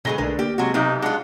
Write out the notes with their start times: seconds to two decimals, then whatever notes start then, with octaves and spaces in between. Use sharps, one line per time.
0.05 D2 B2 F#3 G#3 G#4 B4 A#6 G7
0.18 B1 D3 G#3 A3 D4 A#4 B4
0.39 A#3 G4
0.58 C3 F#3 G#3 F#4
0.74 B1 C3 D#4 G4
1.02 G#3 D4 F4 F#5